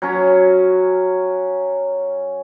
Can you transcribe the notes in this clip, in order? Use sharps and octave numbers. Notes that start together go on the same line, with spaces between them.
F#3 C#4